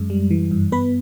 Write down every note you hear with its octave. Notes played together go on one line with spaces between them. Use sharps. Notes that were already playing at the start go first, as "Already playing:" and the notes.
Already playing: F#2 G#3
G3
E3
G2
B3 B4 B5